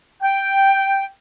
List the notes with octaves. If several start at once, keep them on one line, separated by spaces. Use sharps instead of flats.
G5